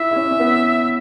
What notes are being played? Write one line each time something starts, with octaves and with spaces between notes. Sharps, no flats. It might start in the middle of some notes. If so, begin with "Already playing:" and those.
Already playing: E4 E5
E4
C#4
C#4
B3